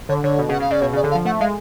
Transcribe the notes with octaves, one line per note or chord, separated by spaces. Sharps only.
D3 C#5
D3 C#5
B2
C#3 F#5
C#3 F5
C#3 D5
B2 C#5
C#3 D5
D3
F5
F3
A3 F#5
G#3 F5